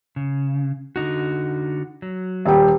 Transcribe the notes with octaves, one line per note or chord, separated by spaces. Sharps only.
C#3
D3 D#4 F#4
F#3
D#1 G3 G5